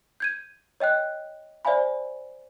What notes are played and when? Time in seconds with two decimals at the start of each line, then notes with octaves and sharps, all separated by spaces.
0.20 G6 G#6 D#7
0.80 C#5 D#5 G5 F#6
1.65 C5 D5 E5 F5 G#5 B5